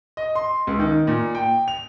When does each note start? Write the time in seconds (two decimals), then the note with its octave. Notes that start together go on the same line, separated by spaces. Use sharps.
0.17 D#5
0.35 C6
0.67 C#2
0.79 D#3
1.07 A#2
1.35 G5
1.68 F7